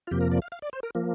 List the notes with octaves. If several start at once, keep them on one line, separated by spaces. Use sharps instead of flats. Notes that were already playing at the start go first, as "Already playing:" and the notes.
F4
F2 C3 F3 A#3 G4
A#4
D5
F5
F5
D5
C5
A#4
F3 A#3